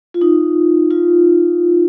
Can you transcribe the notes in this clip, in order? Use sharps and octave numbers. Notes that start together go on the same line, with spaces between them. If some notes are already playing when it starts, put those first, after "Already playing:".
F4
D#4
F4